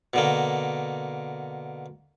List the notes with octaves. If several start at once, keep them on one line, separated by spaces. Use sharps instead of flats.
B2 D3 A#3